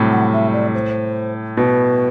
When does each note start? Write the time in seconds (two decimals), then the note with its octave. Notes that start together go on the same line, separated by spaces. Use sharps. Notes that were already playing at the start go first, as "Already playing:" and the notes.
Already playing: A2 C3 F#3 G3
0.11 F#5
0.33 E5
0.53 D5
0.74 C5
1.57 B2 B4